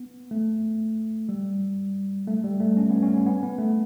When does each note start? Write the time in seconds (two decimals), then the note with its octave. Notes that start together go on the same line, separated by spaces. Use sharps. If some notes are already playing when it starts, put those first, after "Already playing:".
Already playing: B3
0.31 A3
1.29 G3
2.27 A3
2.44 G3
2.60 A3
2.77 C#4
2.90 B3
3.02 C#4
3.26 B3
3.43 B3
3.58 A3